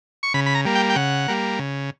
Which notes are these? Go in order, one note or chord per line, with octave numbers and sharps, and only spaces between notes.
C#6
C#3 B5
B5
A#5
G3 A#3
G5
G5
C#3 F#5
G3 A#3
C#3